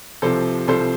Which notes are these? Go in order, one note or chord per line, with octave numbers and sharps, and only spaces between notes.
C2 C3 F3 A4 C5
C2 C3 F3 A4 C5